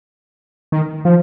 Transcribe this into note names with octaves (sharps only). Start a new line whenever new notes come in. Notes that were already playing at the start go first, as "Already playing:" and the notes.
D#3
F3